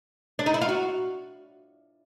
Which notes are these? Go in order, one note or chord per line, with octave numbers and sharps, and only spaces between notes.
D4
D#4
E4
F4
F#4